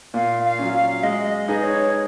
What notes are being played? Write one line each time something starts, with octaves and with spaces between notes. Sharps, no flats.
A#2 F5
F5
F#3 C#4
F5
G#3 D#5
D#5
D#4 G#4 B4
C#5